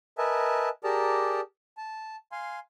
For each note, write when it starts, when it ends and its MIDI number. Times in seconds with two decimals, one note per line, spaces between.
0.18 0.69 70
0.18 0.69 71
0.18 0.69 75
0.18 0.69 76
0.18 0.69 80
0.18 0.69 81
0.84 1.41 67
0.84 1.41 68
0.84 1.41 70
0.84 1.41 74
0.84 1.41 81
0.84 1.41 82
1.77 2.16 81
2.32 2.59 77
2.32 2.59 80
2.32 2.59 84